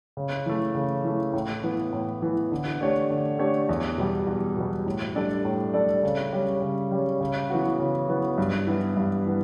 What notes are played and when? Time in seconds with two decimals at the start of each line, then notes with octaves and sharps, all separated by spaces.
0.17 C#3
0.46 E3 A3
0.75 C#3
1.04 E3 A3
1.33 A2
1.64 E3 B3
1.93 A2
2.22 E3 B3
2.51 D3
2.81 A3 D4 G4 C#5
3.10 D3
3.39 A3 D4 G4 C#5
3.69 E2
3.98 B2 G3
4.27 E2
4.57 B2 G3
4.86 A2
5.16 G3 D4 A4 D5
5.45 A2
5.74 G3 D4 A4 D5
6.03 C#3
6.33 G3 C#4
6.62 C#3
6.92 G3 C#4
7.21 C#3
7.50 E3 B3 F#4
7.79 C#3
8.08 E3 B3 F#4
8.38 G2
8.67 E3 B3 E4
8.97 G2
9.26 E3 B3